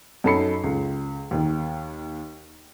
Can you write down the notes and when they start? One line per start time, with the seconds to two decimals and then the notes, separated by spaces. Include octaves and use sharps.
0.24 F#2 D#4 A4 B5 C7 C#7
0.64 C#2
1.31 D#2 D#3